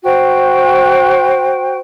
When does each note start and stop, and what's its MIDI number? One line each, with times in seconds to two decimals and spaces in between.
0.04 1.78 66
0.04 1.78 72
0.04 1.78 79